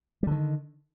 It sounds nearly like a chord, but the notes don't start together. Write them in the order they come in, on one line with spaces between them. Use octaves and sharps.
G3 D3 D#3